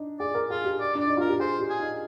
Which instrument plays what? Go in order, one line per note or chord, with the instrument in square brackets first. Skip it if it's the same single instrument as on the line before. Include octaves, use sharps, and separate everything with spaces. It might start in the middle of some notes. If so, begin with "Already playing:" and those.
Already playing: [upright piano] D4 D#4
[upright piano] G#4 [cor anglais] D5
[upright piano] A#4
[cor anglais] F4 [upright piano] G#4
[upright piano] G4
[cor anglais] D5
[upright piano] D4
[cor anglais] D5
[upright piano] D#4
[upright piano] F4 [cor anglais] A#4
[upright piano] G4
[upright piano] G#4 [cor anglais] C5
[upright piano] G4
[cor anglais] G#4
[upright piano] D#4